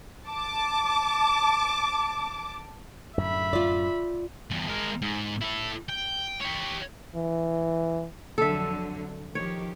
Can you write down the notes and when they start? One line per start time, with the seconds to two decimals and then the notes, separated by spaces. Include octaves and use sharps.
0.28 A5 D6
3.18 F#2 A2 D3 E5 B5
3.53 F4 D5
4.51 E2 G2
4.67 G#3 A#4
5.02 G#2
5.41 E4 A4
5.89 G5
6.41 G4 C#5
7.15 E3
8.38 F2 D3 F#3 A4 E5
9.35 D#3 F3 G4 C#5